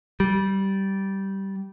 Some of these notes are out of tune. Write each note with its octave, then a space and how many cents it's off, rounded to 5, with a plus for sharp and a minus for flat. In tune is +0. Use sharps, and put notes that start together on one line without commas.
G3 -15